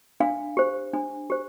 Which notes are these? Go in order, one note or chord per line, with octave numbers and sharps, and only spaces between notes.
D4 F5
G4 C5
D4
G4 C5